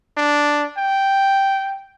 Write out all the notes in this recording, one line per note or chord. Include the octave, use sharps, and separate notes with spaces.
D4
G5